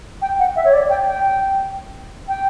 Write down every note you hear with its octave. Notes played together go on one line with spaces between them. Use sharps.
G5
F#5
E5
C#5
D5
G5
G5
G5